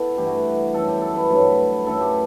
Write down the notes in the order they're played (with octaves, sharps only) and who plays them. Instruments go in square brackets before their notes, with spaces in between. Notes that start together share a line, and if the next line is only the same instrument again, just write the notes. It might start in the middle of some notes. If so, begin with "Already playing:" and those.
Already playing: [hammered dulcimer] B3 E4 A4
G2 E3 A3 G4
F#4
F#2 E3 G3 B3 A4
G4
A4
B4
G2 F#3 A3
F#2 E3 A3 A4
G4